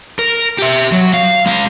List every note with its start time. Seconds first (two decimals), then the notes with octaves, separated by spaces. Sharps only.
0.19 A#4
0.59 G4 E5
0.92 F#3
1.14 F5
1.46 G#3 F5